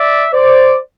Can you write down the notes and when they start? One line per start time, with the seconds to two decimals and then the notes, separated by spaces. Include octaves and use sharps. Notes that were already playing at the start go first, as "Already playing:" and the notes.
Already playing: D5 E5
0.33 C5 D5